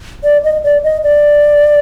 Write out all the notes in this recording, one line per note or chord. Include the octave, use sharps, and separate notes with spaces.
D5
D#5
D5
D#5
D5